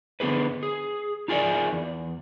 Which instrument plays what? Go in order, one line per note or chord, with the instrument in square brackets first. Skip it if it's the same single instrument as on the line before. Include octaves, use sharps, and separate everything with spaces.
[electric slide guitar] D3 B3 G4 G#4 B4
G#4
D#4 F4 G#4 A#4 D5
E2